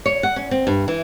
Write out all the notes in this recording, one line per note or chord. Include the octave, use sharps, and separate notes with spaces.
C#5
F#5
C#4
C4
G2
E3